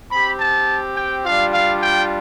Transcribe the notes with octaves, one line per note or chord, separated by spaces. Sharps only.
C4 G4 B5
A5
G5
G3 D4 F4 F5
F5
G5